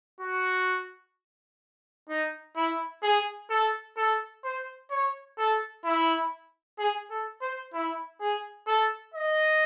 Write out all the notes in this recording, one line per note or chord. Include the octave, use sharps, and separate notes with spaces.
F#4
D#4
E4
G#4
A4
A4
C5
C#5
A4
E4
G#4
A4
C5
E4
G#4
A4
D#5